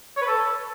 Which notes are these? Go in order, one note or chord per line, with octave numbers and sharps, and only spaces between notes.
C#5
B4
A4